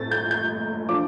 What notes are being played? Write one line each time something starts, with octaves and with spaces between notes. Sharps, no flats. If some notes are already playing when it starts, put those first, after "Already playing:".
Already playing: A2 A3 C4 A6
G6
G6
F3 D4 F4 D6